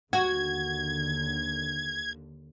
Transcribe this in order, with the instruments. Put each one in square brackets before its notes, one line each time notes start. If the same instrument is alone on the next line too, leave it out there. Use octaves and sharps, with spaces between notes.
[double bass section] D#2 D3 [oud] F#4 [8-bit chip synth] G#6